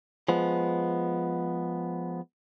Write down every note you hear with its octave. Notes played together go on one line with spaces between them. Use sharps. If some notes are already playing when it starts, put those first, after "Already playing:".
F3 G#3 B3